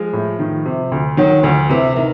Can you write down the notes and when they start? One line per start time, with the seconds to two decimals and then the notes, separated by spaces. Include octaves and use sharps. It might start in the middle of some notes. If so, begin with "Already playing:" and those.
Already playing: F3 G#3
0.13 A2
0.39 D#3
0.66 C3
0.92 D2
1.17 D#3 F#3
1.43 D2 F3
1.70 C3 E3
1.96 D#3